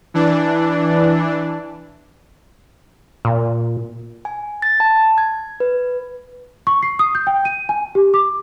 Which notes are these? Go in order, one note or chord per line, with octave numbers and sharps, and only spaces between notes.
E3 D4
A#2
G#5
A6
A5
G#6
B4
C#6
C7
D#6
G6
G5
D#7
G#5
G4
D6